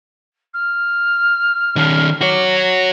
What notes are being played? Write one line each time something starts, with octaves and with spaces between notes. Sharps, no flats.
F6
D#3 C#4
F#4 C#5 D6
A#6